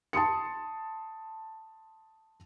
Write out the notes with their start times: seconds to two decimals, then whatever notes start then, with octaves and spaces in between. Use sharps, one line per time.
0.13 A5 C6 D#6 C#7